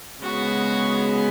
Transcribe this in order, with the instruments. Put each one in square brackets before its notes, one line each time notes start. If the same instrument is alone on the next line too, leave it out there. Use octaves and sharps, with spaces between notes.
[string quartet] C#3 G#3 B3 F#4